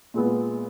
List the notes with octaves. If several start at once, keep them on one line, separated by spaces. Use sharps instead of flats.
A#2 G#3 B3